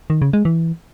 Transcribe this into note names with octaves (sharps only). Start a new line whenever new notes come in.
D#3
C#3
G#3
E3